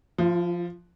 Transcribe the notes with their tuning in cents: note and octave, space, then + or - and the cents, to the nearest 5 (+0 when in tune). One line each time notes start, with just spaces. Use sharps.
F3 +0 F4 -45